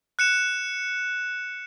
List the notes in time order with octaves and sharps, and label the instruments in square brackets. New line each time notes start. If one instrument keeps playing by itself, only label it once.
[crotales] F#6 C#7 E7